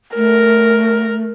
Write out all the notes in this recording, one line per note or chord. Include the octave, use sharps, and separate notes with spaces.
A3 A#4